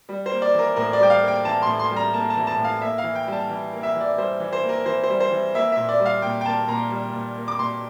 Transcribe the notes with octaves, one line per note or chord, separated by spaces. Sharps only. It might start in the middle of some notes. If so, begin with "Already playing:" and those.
G3
C5
A#3
D5
E3 A#4
A2 A#4
D5
G3 G5
F5
A#3
G5
E3 A5
A2 C6
C6
G3
A#5
A#3 A5
A5
E3
A5
A2
F5
A#3 E5
F5
E3
G5
G3
A5
E3
A#3
E5
E3
D5
G3 C5
E3
C5
A#3
A#4
E3 C5
C5
G3
C5
E3
A#3 E5
A#2 E5
D5
G3
F5
A#2 G5
G5
A#3 A5
A#2 A#5
G3
A#2
A#3
D6
A#2 C6